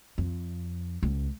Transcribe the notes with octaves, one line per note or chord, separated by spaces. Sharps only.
F2
C#2